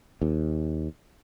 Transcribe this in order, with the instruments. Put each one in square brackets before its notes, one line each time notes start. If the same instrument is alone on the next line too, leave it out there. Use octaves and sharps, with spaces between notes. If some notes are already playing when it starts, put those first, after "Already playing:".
[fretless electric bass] D#2